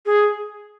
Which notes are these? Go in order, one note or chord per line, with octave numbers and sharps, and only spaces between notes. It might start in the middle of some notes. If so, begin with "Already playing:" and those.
G#4